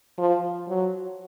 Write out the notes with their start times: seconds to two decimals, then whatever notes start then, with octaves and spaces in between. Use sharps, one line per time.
0.19 F3
0.69 F#3